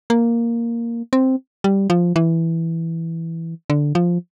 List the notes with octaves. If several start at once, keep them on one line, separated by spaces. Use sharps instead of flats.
A#3
C4
G3
F3
E3
D3
F3